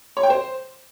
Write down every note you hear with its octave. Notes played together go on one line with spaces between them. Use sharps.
C#5
G5
C5